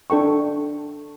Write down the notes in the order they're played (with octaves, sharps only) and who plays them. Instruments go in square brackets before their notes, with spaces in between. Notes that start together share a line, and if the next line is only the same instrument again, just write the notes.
[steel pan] D4 A4 G5 C#6